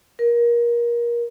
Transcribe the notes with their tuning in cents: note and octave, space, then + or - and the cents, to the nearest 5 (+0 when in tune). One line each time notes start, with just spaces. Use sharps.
A#4 +25